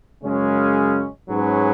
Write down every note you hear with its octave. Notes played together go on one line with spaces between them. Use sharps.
F#2 C#3 G#3 C#4
G#2 F#3 C#4 G#4 B4